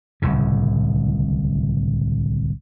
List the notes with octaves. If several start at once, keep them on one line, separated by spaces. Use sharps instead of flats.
D1 C2 A2 C#3